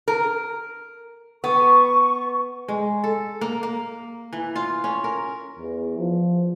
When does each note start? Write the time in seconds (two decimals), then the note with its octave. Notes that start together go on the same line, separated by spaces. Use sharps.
0.08 A#4
1.44 B3 C#6
2.68 G#3
3.04 A4
3.41 A#3
3.63 A#3
4.33 E3
4.56 F4
4.84 C#4
5.04 A#4
5.59 E2
5.98 F3